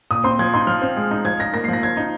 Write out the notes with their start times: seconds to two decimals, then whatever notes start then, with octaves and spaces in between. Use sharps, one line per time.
0.11 A#2 D#6
0.24 C4 C6
0.39 F3 G#6
0.53 D#4 C6
0.67 F3 F6
0.82 C4
0.96 G#3
1.11 D#4
1.25 F3 G#6
1.39 D#4 A#6
1.54 A#3 A#6
1.64 C7
1.68 F3
1.73 A#6
1.83 F3 G#6
1.97 D#4